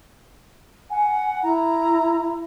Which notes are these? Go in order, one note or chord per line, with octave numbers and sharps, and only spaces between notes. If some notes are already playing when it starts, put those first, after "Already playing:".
F#5 G#5
E4 A#5